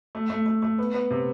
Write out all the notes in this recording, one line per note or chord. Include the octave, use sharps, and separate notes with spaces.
A3
A3
A3
A3
B3
B3
C3